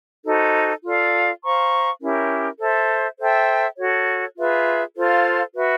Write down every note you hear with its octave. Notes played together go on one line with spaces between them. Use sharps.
D#4 F#4 A4 C5
F4 A4 D5 F5
C5 F5 A#5 C#6
C#4 E4 G4 A#4
A4 C5 E5
A4 C5 E5 G5
F#4 A4 C#5
F4 G#4 B4 E5
F4 A4 C5 F5
F#4 B4 E5